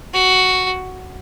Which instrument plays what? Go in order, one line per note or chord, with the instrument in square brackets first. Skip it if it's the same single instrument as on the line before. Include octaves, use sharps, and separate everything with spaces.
[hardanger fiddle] F#4